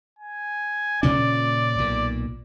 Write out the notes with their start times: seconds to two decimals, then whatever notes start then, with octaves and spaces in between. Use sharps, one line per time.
0.19 G#5
1.03 A#2 C#3 C#4 D5
1.79 B1 A#2